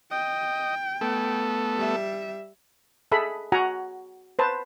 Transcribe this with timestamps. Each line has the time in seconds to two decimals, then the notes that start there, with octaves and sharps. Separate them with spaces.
0.11 D#5 G5
1.01 A3 B3 A4
1.76 G3 E5
3.12 G#4 A4 E5 B5
3.52 F#4 F#5 G#5 A#5
4.39 B4 C5 A5